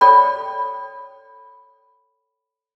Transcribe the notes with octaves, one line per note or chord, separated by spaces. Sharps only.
A4 C#5 D5 G5 B5